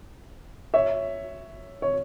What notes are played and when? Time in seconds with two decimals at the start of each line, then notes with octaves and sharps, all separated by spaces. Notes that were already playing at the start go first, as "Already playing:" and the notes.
0.74 C#5 E5
1.82 C#5